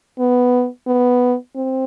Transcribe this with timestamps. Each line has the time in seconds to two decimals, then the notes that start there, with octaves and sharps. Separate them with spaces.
0.19 B3
0.87 B3
1.56 C4